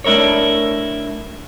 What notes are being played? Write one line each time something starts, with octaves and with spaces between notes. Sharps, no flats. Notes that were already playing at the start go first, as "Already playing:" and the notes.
A3 D4 E4 A#4 C#5